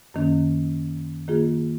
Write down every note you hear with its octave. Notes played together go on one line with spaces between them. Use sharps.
F#2 D#3 A#3 C#4
D#3 A#3 F4 G#4